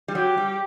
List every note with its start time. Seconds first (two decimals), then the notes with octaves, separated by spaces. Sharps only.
0.08 G3
0.15 F#3 G4
0.37 G3